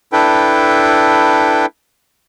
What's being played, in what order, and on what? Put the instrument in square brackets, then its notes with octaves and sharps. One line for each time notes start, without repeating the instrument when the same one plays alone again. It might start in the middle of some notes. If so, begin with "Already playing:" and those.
[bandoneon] D4 E4 A4 B4 G5